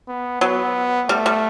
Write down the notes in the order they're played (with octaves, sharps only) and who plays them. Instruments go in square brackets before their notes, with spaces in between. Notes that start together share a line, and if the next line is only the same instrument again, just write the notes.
[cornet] B3
[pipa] F#3 [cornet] B3
[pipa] G3 [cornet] A3
[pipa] G3